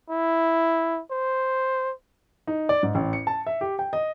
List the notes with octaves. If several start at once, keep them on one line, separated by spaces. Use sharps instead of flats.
E4
C5
D#4
D5
G#2
A1
C#7
A5
E5
G4
G5
D#5